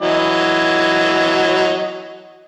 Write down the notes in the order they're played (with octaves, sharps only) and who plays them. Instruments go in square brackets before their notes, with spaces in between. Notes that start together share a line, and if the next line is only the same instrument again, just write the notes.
[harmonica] E3 F#3 D#5